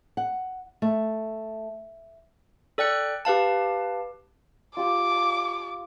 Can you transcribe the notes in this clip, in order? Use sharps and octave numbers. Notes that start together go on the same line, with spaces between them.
F#5
A3
A4 D5 G5 F#6 C#7
G4 B4 F5 A5
F4 G4 D6